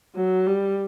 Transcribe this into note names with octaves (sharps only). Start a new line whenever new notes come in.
F#3
G3